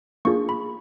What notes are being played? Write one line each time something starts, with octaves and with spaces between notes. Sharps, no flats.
A#3 D4 F4 G#4 C#6
B5